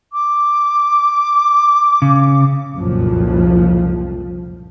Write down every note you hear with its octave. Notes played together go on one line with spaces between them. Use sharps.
D6
C#3
F#1 C2 F2 A#2 F3